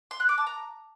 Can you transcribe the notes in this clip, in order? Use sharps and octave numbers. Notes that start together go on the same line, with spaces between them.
C6
F#6
D6
A5
A#5